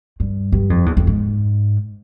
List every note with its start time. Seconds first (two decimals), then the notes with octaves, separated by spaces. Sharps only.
0.20 G2
0.52 G2
0.70 F2
0.86 E2
0.97 F2
1.07 G#2